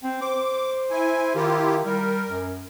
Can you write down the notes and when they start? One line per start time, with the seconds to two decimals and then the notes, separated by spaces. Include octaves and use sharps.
0.03 C4
0.21 C5 D6
0.91 E4 G#5
1.35 D#3 E4 F4 G4
1.85 G3 A#4
2.29 F#2